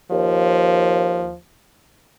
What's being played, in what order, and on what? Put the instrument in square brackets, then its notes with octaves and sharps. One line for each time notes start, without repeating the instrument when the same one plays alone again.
[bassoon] D#2 [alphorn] F3